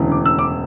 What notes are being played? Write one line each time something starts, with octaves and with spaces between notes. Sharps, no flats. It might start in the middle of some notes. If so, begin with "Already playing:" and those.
Already playing: E1 D2 C#3 E3
D6
E6
D6